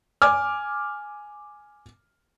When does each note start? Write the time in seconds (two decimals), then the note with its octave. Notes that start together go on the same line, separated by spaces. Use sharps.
0.22 G#5 D6 F6